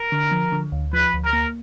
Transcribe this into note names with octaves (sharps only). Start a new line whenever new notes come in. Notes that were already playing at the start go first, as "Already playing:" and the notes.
Already playing: A#4
D3
F3
D3
D2
F3 B4
D2
A#4
A#3